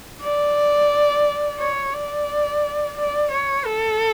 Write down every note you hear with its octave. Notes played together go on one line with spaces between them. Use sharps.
D5
C#5
D5
D5
C#5
A4